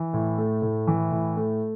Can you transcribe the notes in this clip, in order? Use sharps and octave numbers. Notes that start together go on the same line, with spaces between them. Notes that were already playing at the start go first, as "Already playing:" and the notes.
Already playing: E3
A2
A3
A2
E3
A2
A3